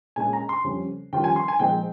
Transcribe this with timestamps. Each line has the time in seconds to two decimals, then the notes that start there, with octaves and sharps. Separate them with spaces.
0.16 A#2 G#3 C#4 G#5
0.33 A#5
0.49 C6
0.64 F2 C#3 G3 C#4
1.12 F2 D#3 G3 C#4 F4 G5
1.24 G#5
1.36 C6
1.48 G#5
1.59 A#2 F3 G#3 C4 D#4 G5